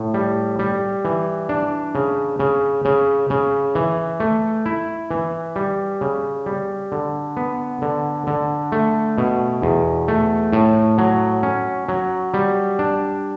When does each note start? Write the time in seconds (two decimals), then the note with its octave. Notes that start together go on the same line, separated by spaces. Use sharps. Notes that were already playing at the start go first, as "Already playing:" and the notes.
Already playing: A2
0.14 G3
0.59 G3
1.05 E3
1.49 D4
1.95 C#3
2.40 C#3
2.85 C#3
3.30 C#3
3.75 E3
4.20 A3
4.66 E4
5.11 E3
5.56 G3
6.01 C#3
6.46 G3
6.92 D3
7.37 B3
7.82 D3
8.27 D3
8.72 A3
9.18 B2
9.62 E2
10.08 A3
10.53 A2
10.98 F#3
11.43 C#4
11.89 F#3
12.34 G3
12.79 D4